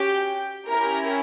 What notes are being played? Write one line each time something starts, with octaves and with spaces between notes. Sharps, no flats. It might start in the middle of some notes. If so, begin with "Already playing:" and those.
Already playing: C#4 F#4 G4 G5
C#4 E4 G4 A#4 A#5